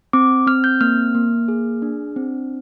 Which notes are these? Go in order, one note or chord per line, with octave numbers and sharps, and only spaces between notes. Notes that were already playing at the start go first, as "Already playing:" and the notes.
C4 D6
C4 F6
G6
A#3 F6
A#3
G#4
D4
C4